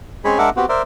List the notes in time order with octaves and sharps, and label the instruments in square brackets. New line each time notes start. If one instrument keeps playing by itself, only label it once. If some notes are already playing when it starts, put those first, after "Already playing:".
[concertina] G#3 C4 C#4 G#4 C#5 B5
G#3 D4 A#4 E5 F#5 D6
B3 C4 F#4 G4
A#4 C5 D5 E5